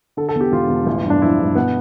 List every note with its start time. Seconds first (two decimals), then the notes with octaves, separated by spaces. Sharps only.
0.17 D3 A4
0.29 A4
0.35 E2
0.41 G4
0.52 E1 F4
0.69 E1
0.86 A1
1.04 G2
1.10 D4
1.22 F3 E4
1.39 G2
1.55 B2 B3